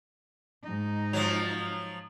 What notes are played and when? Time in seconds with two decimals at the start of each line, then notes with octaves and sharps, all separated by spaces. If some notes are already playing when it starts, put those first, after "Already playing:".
0.64 G#2 D#4
1.13 F3 F#3